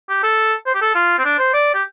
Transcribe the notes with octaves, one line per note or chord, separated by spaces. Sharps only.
G4
A4
C5
G4
A4
F4
C4
D4
C5
D5
G4